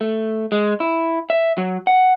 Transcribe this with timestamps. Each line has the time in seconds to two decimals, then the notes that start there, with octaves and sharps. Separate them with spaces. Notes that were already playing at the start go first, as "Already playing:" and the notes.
0.01 A3
0.52 G#3
0.80 E4
1.30 E5
1.58 F#3
1.87 F#5